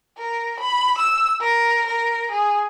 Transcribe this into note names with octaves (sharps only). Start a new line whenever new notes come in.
A#4
B5
E6
A#4
A#4
G#4